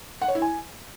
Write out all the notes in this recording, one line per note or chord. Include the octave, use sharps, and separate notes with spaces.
F#5
C#5
E4
G#5